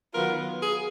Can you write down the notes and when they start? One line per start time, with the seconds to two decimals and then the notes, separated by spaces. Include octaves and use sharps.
0.14 D#3 F#3 B3 F4 A#4
0.62 G#4